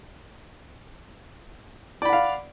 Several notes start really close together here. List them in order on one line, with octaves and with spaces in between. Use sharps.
D5 B5 F#5 F5